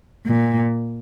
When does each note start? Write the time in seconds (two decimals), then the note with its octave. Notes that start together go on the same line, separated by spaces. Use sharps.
0.26 A#2